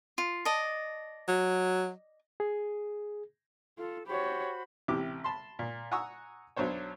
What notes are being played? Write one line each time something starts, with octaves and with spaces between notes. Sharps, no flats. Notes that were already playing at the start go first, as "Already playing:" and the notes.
F4
D5 D#5 A5
F#3
G#4
F4 A4
F#4 G4 C5 C#5 B5
A1 C3 E4 G4 D6
A5 B5 C6
A#2
F#5 G#5 A#5 C#6 D#6 E6
B1 F#3 D4 C5 C#5